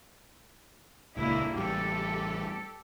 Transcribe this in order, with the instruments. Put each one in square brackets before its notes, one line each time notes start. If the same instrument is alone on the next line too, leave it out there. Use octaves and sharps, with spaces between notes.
[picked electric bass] D#1 C#2 [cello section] D3 A#3 E4
[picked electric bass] A1 G3 [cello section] G4 A4